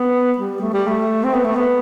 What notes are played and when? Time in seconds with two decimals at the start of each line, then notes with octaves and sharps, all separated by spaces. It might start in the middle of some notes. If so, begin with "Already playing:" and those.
Already playing: B3
0.38 G3
0.61 A3
0.73 G3
0.88 A3
1.24 C4
1.34 B3
1.44 A3
1.56 B3